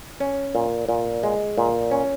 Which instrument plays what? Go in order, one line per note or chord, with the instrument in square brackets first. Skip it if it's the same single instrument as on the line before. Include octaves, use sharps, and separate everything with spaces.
[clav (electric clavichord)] C#4
A#2
A#2
G#3
A#2
C#4